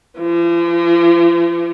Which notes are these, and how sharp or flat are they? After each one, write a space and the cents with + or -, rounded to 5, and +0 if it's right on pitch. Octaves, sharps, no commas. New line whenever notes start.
F3 -45